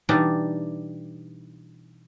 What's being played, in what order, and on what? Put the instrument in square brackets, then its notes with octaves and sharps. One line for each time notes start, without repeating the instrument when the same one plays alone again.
[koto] B2 E3 G3 D4 D#4